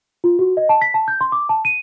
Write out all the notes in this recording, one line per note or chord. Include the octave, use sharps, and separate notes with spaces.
F4
F#4
D#5
A5
B6
A5
G6
C6
D6
A5
D#7